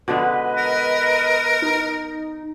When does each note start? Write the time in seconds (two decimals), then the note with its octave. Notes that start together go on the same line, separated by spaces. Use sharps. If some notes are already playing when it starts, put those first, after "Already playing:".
0.08 B2 D3 G#3 B4 D#5
0.57 A#4
1.62 D#4